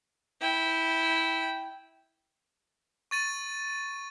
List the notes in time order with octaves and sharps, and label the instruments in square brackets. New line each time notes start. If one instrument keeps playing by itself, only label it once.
[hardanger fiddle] E4 G5
[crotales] C#6 A6 D#7